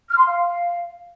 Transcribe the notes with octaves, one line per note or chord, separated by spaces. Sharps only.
F6
C6
F5